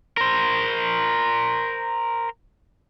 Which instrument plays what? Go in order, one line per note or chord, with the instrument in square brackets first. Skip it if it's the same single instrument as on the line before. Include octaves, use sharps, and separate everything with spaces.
[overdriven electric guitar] A#4 C5